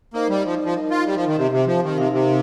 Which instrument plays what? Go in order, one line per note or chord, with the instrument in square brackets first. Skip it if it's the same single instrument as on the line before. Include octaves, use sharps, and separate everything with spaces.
[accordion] A#3 [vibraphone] D#4 C5 D#5
[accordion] G3
F3
F3
[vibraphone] D#4 A#4 D#5
[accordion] F4
G3
F3
D#3
[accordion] C3 [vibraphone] C4 G4 C5
[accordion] C3
F3
D#3
[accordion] C3 [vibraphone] D#4 A#4 F5
[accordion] C3